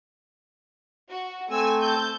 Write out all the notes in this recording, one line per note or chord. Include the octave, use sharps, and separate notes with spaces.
F#4
A3 C4 A4 G#5 E6
A5 G6